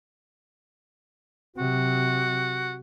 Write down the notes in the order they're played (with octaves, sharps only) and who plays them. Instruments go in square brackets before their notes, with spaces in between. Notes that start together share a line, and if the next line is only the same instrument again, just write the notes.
[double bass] C3 F#3 [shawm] F#4